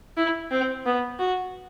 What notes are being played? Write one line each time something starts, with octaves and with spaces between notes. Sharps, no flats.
E4
C4
B3
F#4